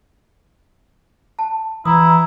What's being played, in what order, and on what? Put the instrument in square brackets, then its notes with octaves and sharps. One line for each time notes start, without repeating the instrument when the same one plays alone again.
[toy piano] A5
[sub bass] E3 [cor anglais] E4 [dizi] A#5 [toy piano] D#6